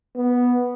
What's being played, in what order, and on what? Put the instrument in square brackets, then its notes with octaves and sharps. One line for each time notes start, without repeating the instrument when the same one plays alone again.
[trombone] B3